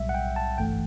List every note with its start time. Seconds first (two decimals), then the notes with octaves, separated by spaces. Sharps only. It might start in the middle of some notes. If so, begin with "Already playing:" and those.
Already playing: B1 A2 G3 E5
0.09 F#5
0.14 G5
0.36 A5
0.58 G1 G2 E3 A3 G5